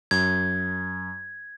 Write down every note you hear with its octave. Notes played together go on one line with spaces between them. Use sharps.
F#2 G#6